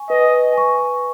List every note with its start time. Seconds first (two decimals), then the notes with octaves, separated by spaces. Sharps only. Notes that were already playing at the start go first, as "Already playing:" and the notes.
Already playing: G#5 C#6
0.09 B4 D#5
0.53 G#5 C#6